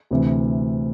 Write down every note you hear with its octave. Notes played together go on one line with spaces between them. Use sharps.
D2 C3 E3